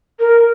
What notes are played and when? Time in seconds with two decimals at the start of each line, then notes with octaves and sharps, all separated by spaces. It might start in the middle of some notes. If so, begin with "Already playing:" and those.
0.20 A#4